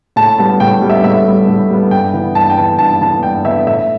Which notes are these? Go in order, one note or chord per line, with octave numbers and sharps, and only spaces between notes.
A2 A5
G3 B3 A5
A2 G5
G3 B3
E5
A2 E5
G3 B3
A2
G3 B3
G2 G5
E3 B3
G2 A5
G5
E3 B3 A5
G2 A5
E3 B3 A5
G2 G5
E3 B3 E5
A2 E5